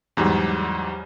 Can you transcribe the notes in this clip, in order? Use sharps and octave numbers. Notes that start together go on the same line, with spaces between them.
E2 G#2 F#3 G3